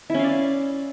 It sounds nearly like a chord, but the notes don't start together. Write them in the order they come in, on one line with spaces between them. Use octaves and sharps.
E4 C#4 F5 D5